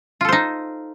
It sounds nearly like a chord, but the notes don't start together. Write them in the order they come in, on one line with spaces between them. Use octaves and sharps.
F4 A4 C5 D#4